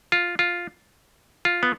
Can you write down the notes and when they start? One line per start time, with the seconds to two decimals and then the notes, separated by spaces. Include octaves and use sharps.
0.12 F4
0.39 F4
1.45 F4
1.63 B3